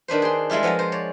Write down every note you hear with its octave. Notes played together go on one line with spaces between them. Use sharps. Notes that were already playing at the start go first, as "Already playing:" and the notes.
D#3 D4 B4 C5
G#4 C6
G3 G#3 E4 F4 G4
F3 B3 F#5 G#5 A#5
C5
C#5 D5